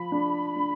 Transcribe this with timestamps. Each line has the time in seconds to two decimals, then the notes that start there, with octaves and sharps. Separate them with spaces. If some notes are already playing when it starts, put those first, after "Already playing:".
Already playing: F3 B5
0.12 D4
0.56 D4